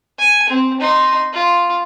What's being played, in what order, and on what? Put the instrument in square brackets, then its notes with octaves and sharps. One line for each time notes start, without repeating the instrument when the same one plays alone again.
[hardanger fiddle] G#5
C4
D#4 C6
F4